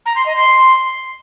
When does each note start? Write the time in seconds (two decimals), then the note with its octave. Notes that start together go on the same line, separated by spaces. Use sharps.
0.06 A#5
0.16 C6
0.26 D#5
0.36 C6